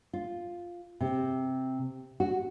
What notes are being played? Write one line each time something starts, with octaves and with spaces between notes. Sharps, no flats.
F4
C3
F#4